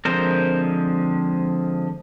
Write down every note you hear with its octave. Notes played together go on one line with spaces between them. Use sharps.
D3 F3 G#3 C4 A#4 C5